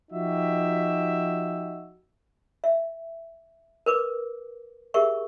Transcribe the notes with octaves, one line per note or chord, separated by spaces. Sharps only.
F3 D#4 F#4 G4 E5
E5
A#4 B4 D6
G4 G#4 A#4 E5 C#6